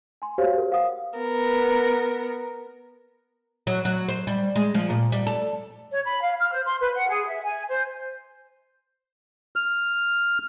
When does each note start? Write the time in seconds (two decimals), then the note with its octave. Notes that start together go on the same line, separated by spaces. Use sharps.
0.22 G#5 C6
0.38 F#4 G4 C5 C#5 F5
0.57 G#4 A#4
0.72 F5 F#5 D#6
1.18 B3 A#4
3.67 F#3
3.85 F#3
4.08 C5
4.27 G3
4.56 G#3
4.75 F3
4.90 A#2
5.12 G3
5.27 A4
5.91 C#5
6.05 B5
6.21 F5
6.39 F6
6.52 C5
6.65 C6
6.81 B4
6.95 F#5
7.09 G#4
7.27 E5
7.43 G#5
7.69 C5
9.56 F6